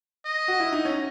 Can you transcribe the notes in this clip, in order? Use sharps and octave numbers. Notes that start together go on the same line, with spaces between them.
D#5
F#4
E4
D#4
C#4